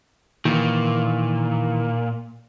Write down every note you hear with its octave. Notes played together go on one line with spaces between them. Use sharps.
A#2 D#3 E3